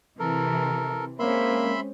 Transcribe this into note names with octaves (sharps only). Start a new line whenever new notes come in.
C3 E3 A4 A#4
G#3 A#3 C4 C#4 E5 B5 C6